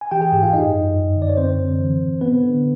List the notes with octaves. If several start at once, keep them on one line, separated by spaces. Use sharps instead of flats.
G#5
E3 G4 G5
G#4 G#5
G#2 G4 G5
F4 F5
F#2 D#4 D#5
F#2
G2
D3
D5
C#5
F#2 C4 C5
D3
E3
A2
D3 B3 B4
D3